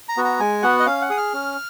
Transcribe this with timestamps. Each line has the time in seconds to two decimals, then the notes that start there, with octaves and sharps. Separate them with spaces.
0.09 A#5
0.17 B3 F#4
0.24 A#5
0.40 G#3 G#5
0.62 B3 F#4 F#5
0.80 D#5
0.86 C#4 F5
1.02 F#5
1.10 G#4 D#6
1.18 F6
1.33 C#4